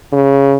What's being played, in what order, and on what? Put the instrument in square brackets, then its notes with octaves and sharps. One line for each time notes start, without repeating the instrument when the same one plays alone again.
[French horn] C#3